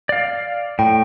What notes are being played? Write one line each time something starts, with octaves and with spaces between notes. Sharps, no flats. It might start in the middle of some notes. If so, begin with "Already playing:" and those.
D5 F5
A2 G5